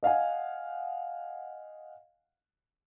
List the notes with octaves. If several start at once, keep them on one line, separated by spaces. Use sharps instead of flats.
D#5 F5 F#5 G#5